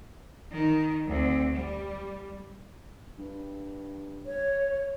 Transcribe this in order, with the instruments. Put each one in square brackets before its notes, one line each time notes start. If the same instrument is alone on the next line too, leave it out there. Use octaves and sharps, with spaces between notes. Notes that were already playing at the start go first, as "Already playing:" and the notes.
[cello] D#3
D2 C4
G3
[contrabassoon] G2
[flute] C#5